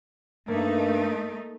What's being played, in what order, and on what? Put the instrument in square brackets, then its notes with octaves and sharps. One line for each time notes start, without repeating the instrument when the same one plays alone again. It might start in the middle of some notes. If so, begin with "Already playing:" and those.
[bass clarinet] G2 [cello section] A3 D#4 [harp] A#3